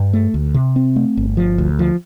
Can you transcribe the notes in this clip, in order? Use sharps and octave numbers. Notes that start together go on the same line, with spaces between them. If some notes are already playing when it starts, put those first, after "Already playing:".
Already playing: G2
A3
D2
C3
C4
A3
G1
F3
D2
F3